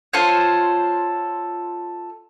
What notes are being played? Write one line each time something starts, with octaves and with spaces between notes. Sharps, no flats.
F4 A4 C5 C#5